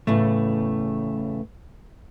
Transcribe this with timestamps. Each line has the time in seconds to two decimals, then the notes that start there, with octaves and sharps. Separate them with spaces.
0.07 E2 A2 C#3 A3